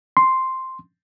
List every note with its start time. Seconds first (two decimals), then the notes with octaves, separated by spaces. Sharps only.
0.17 C6